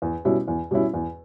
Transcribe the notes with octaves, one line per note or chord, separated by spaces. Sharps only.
E2
B2 G3 C#4 E4
E2
B2 G3 C#4 E4
E2